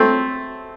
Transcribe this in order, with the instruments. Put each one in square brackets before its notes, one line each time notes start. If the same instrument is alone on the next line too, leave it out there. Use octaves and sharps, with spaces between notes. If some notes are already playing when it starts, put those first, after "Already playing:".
Already playing: [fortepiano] A3 C4